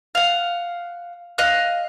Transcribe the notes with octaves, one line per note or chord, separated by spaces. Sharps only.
F5 F#5
D#5 F5 F#6